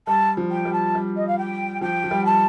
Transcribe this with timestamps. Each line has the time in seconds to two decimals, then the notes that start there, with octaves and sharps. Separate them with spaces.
0.07 G3 A5
0.37 F3
0.51 G5
0.65 G3
0.73 A5
0.95 G3
1.16 D#5
1.28 F5
1.38 G5
1.81 F3 G5
2.04 F3
2.11 G3
2.25 A5